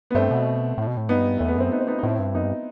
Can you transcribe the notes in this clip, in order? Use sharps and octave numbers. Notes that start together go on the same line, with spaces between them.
B3
G2 A3 C4
B2
A2
B2
A2
G2 B3 D#4
E2 A3
B3
F#2 C4
B3 D#4
C4
B3 D#4
D#4
A2 C4 E4
G2
F#2 B3 D#4
G2